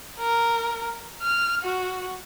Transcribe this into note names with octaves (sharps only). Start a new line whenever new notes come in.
A#4
F6
F#4